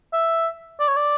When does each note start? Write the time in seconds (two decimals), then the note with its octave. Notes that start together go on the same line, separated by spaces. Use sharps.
0.13 E5
0.80 D5
0.88 C#5
0.96 D5